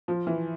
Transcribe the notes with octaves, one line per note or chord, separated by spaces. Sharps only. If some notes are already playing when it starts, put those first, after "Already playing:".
F3
E3